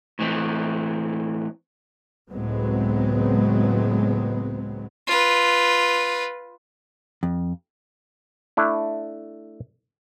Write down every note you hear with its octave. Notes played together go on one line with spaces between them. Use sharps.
A2 E3 C4
C#2 A2 F#3 G#3 B3 C4
F4 B4
F2
A3 D4 E4